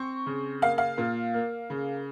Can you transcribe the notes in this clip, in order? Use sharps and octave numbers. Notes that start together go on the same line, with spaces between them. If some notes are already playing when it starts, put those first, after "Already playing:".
Already playing: C4 C#6
C#3
A#3 F5
F5
A#2
A#3
C#3